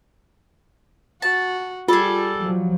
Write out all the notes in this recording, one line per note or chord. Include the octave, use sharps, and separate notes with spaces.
F#4 A5
G3 F4 G#4 A4
F3 F#3